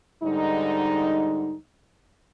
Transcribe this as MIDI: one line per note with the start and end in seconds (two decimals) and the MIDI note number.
0.23 1.54 44
0.23 1.54 50
0.23 1.54 55
0.23 1.54 63